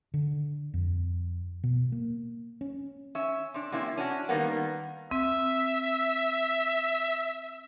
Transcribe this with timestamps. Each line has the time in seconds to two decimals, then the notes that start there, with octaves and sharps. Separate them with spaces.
0.14 D3
0.74 F2
1.63 B2
1.92 A#3
2.61 C#4
3.15 C#4 E5
3.54 C3 D4
3.72 C3 A#3 C#4 E4
3.97 C#4 D4 F#4
4.29 D#3 G3 A#3 B3
5.11 C4 E5